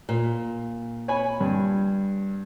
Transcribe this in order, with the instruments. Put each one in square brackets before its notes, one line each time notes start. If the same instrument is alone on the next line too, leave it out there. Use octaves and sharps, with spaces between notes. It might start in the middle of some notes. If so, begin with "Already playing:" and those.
[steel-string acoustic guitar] A#2
[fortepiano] C#5 G#5 B5
G2